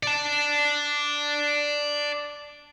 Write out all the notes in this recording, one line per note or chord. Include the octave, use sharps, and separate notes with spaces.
D5 A5